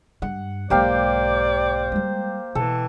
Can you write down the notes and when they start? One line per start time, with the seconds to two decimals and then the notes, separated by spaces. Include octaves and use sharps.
0.22 G2 F#5
0.70 B1 G#2 A#3 G4 C5 D5 F5
1.92 G3 G#3
2.55 B2 E3 A4